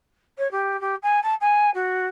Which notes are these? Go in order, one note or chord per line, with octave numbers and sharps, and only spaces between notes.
C#5
G4
G4
G#5
A5
G#5
F#4